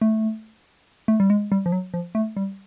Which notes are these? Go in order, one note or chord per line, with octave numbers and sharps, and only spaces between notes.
A3
A3
G3
G#3
G3
F3
F#3
F3
A3
G3